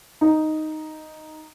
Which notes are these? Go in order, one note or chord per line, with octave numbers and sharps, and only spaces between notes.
D#4